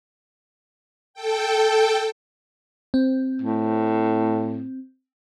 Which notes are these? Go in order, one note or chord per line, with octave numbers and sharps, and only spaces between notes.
A4 G5
C4
A2